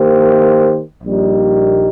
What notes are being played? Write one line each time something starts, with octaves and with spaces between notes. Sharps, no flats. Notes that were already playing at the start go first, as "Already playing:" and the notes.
Already playing: D#3 A#3 G4 C5
A#1 A#2 G3 D#4